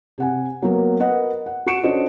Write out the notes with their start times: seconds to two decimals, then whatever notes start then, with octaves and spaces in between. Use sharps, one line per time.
0.18 C3 F#5 G#5
0.62 F#3 A#3 B3 A#4 B4
0.99 A#4 B4 D#5 F#5
1.46 F#5
1.66 F#4 F#5 C#6 C#7 D7 E7
1.83 C#4 D4 F#4 A4 C5 D#5